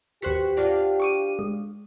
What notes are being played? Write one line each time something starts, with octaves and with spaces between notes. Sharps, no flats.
D#2 F#4 G4 B4 C5 F#6 B6
D4 F4 F#4
C#6 D6 D#7
G#3